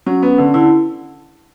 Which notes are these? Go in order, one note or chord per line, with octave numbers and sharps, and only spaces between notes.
F#3 C#4
B3
D3
D3 E4